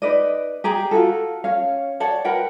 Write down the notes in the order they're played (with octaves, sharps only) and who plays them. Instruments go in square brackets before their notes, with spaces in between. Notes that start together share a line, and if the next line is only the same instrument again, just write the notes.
[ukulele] D#4 B4 D5 D#5
G4 G#4 A#5
F4 F#4 A4
C#4 C#5 F5
C#5 D5 F#5 A5
A#4 B4 F#5 G5